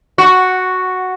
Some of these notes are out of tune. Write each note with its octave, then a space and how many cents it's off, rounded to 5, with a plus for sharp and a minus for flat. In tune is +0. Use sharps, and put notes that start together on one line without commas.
F#4 +0